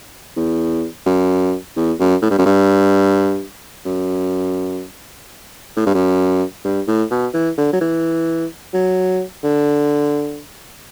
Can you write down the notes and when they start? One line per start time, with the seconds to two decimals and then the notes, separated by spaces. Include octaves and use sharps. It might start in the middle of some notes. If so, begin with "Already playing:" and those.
0.37 E2
1.06 F#2
1.77 E2
2.00 F#2
2.22 A2
2.31 G2
2.38 F#2
2.46 G2
3.86 F#2
5.76 A2
5.86 G2
5.95 F#2
6.65 G2
6.88 A2
7.11 B2
7.34 E3
7.58 D3
7.73 F#3
7.81 E3
8.73 F#3
9.44 D3